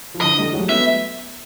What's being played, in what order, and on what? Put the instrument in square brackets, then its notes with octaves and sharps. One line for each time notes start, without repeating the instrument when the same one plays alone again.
[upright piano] F3
[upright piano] D3 E3 [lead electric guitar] D#5
[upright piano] G3 A3
F#3 G#3
[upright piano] A3 B3 [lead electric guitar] E5